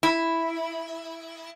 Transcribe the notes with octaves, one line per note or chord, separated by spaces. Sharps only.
E4